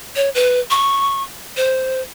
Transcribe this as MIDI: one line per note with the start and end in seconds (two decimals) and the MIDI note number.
0.16 0.29 73
0.35 0.60 71
0.70 1.23 85
1.57 2.02 72